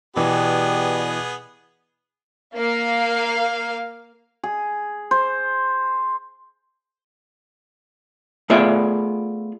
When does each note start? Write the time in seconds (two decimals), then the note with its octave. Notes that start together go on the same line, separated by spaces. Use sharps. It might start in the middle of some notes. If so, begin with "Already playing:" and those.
0.16 B2 E3 B3 G4 G#4 D5
2.56 A#3 F5
4.43 G#4
5.11 C5
8.50 A3 B3 F4 G#4 D5 E5